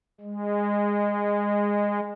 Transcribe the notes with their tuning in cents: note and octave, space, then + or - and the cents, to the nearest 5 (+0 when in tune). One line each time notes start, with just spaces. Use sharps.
G#3 -20